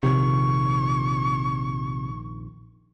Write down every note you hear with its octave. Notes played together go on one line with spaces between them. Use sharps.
A#1 F2 C3 D#3 C#6